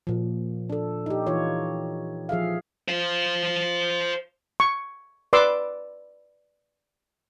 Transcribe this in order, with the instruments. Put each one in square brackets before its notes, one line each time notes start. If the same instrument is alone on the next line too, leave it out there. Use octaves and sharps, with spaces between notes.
[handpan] A#2 F3
D4 A4
D#4 G4
E3 D#4 F4 C#5
F3 G#4 E5 F5
[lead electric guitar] C5 F5
[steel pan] C#6
B4 D5 C6 D6 E6